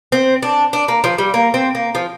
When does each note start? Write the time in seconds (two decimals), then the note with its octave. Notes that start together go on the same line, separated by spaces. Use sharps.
0.12 C4
0.43 D4
0.73 D4
0.88 A#3
1.04 F3
1.18 G3
1.34 A#3
1.54 C4
1.75 A#3
1.95 F3